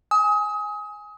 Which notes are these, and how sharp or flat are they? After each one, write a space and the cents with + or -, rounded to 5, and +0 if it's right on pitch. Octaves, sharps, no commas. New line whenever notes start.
G#5 +0 D#6 +30